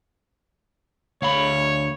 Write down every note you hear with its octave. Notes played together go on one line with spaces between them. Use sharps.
D2 C#5 F5 B5